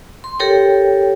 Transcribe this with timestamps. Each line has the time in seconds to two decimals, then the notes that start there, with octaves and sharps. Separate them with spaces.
0.24 C6
0.40 G4 A4 A#4 C#5 G5